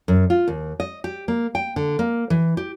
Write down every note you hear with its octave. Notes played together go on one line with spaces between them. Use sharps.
F#2
F4
D#2
D#5
G4
A#3
G5
D3
A#3
E3
G4